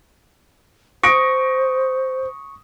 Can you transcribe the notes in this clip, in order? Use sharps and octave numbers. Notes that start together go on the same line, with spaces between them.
C5 C#6 D#6 A#6 D7